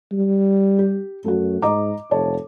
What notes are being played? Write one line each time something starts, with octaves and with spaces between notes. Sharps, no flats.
G3
G4
F#2 A3 F#4
G#2 D#5 A#5 D6
F1 A4 C#5 A5